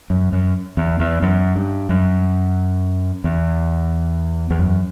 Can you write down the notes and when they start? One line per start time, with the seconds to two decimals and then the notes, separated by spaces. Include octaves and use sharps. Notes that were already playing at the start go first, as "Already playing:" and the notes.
0.10 F#2
0.33 F#2
0.77 E2
1.00 E2
1.22 F#2
1.56 G2
1.89 F#2
3.24 E2
4.50 E2
4.59 F#2